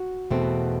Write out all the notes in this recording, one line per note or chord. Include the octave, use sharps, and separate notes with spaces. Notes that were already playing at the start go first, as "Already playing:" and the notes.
Already playing: F#4
E2 B2 A3 C4